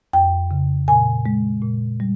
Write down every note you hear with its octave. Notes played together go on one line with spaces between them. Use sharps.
F2 G5
C#3
A#2 G#5
G#3
A#2
G3